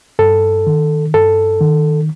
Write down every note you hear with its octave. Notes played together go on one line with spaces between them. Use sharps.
G2 A4
D#3
G2 A4
D#3